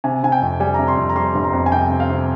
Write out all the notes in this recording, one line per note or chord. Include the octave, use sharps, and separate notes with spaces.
C3 G#5
C3 G#5
G5
F2
G3 G#5
C3 A#5
C6
F2
A#5
G3 C6
G1
A#5
F2
G#5
C3 G5
C3
F5
C3